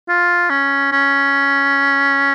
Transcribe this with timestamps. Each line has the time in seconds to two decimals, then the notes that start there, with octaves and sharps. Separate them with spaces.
0.09 F4
0.50 C#4
0.92 C#4